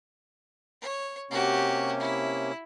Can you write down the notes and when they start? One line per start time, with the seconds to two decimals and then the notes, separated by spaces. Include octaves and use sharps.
0.82 C#5
1.31 C3 A#3 C#4 F#4 G4
1.99 E4